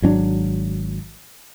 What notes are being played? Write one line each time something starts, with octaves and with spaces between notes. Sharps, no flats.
G#1 F#3 C#4 D4